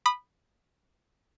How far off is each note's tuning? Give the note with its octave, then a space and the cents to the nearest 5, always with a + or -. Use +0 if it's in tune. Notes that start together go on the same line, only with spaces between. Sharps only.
B5 +0 D#6 -30